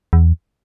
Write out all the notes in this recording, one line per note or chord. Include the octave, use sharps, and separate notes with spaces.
E2